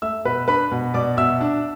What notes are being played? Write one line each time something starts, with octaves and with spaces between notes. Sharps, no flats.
A3 E5 E6
B2 B4 B5
D4 B4 B5
B2
B2 D5 D6
B2 E5 E6
D4